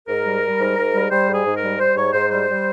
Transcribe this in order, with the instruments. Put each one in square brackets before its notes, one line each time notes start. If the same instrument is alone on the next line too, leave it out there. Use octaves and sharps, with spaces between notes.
[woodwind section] G#2 A#4
G3
G3
G#2
G#2
G3
G3 C5
G#2 G#4
G#2
A#4
G3
G3 C5
G#2 C#5
G#2 C5
G3 C5
G3